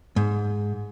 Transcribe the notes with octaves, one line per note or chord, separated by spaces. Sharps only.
G#2